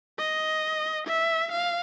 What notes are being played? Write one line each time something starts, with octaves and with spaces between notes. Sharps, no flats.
D#5
E5
F5